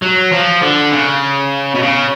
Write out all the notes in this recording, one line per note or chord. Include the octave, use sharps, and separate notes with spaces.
F#3
F3
D3
C#3
B2
C#3